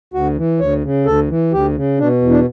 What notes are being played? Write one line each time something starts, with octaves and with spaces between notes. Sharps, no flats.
D2 F#4
E3
D2 C#5
C#3
D2 A4
E3
D2 G4
C#3
B2 D4
E2
D4